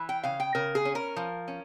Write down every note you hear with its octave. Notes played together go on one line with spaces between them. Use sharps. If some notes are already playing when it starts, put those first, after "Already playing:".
Already playing: E3
G5
C#3 F5
G5
C#3 A#4
G#4
C#4
A#4
F3
C#4